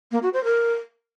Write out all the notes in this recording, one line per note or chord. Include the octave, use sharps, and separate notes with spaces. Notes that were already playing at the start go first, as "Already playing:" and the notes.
A#3
F#4
C5
A#4